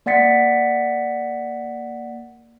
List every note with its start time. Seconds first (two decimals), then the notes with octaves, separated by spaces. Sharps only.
0.06 A#3 D5 F#5 A6 B6 C#7